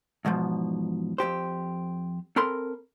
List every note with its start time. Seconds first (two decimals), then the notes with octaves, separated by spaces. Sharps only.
0.25 E2 G#2 B2 F3
1.18 F2 G#2 G4 C5
2.36 C4 A4 A#4 B5 C6